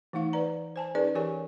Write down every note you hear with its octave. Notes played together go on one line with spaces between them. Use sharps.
E3 A3 D#4 F5 C#6
B4 D5 A#5
C5 G#5 A5
C#4 D#4 G#4 A#4 B4 D5
E3 G4 A#4 C#5 G#5 C#6